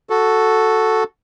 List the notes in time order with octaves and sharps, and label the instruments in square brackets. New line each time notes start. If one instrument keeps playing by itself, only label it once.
[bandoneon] F#4 A4